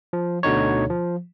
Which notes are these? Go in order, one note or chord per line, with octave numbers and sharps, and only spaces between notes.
F3
D2 B2 D3 D#4 C#5
F3